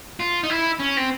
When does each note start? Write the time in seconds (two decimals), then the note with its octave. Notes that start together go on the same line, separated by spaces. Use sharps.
0.20 F4
0.43 D#4
0.50 E4
0.79 C#4
0.97 C4